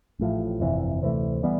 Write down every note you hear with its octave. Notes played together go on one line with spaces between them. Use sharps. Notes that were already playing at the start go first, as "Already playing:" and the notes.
A1 A2 F3
G1 F2 C3 E3
D2 C3 E3 A3
E3 G3 B3